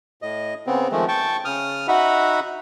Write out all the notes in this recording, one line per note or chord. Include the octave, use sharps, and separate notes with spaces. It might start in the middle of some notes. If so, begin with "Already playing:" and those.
A2 D#5
C#3 B3 C4
D#3 F3 G#3 A3
G5 A5 C#6
C#3 D#6 F6
D#4 F#4 E5 F#5 B5